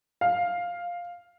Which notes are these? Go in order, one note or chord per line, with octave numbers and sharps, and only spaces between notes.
F5